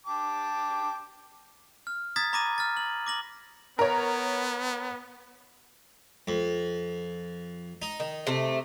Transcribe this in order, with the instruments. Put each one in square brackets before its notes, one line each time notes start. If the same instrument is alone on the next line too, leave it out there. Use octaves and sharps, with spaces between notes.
[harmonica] G5 A5 D6
[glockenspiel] F6
A#5 D#6 G#6 A6 B6
A#5 B5 D6 A#6 B6 D#7
F6 A6
F6 F#7
D6 A#6 F#7
[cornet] B3 [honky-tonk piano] A#4 C#5
[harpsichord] F2
D#4
[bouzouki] D#3
C3 A3